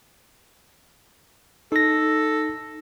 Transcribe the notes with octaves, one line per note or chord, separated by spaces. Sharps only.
D#4 A4 A#6